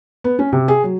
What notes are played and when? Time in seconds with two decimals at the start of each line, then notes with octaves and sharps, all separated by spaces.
0.24 B3
0.39 C#4
0.53 C3
0.68 G#4
0.84 F#3